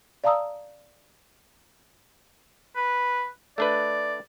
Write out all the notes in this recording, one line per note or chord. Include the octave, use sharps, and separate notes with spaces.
D5 F5 A5 A#5 D#6 E6
B4
A3 D4 B4 D5